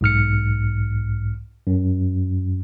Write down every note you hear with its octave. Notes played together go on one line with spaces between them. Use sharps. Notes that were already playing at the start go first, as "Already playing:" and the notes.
B1 G#2 F6 C#7
F#2